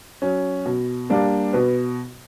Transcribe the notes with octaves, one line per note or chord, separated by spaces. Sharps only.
F#3 C#4
B2
G3 A#3 D4
B2 B4